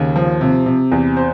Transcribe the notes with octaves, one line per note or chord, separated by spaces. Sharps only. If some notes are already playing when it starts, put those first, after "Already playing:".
Already playing: D#2 C#3
F3
C3
C3
E2
C5